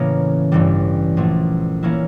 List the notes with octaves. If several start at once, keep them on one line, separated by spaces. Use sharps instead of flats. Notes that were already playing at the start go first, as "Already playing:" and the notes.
Already playing: A2 C#3 E3 A#3 C#4
A1 G2 E3 G3
A#1 A#2 A3
E3 A#3 C#4 E4